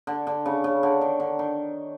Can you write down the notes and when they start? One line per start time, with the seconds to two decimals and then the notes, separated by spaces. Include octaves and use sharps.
0.07 D3
0.27 D3
0.46 C#3
0.64 C#3
0.83 D3
1.01 D#3
1.20 D3
1.39 D#3